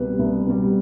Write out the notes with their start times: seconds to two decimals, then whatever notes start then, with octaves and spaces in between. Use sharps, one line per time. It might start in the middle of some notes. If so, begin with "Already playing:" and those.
Already playing: C2 B2 G3 B4
0.19 C2
0.46 B2 G3